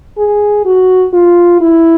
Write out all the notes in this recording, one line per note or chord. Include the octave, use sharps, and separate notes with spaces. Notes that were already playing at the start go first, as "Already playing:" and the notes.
G#4
F#4
F4
E4